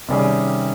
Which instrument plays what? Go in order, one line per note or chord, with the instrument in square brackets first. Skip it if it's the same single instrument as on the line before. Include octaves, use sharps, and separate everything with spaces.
[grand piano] C3 D#3 G3 C#4 G#4